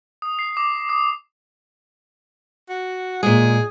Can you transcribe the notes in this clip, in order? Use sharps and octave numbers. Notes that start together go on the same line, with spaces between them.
D#6
C7
D6
D#6
F#4
A#2 G#3 G#4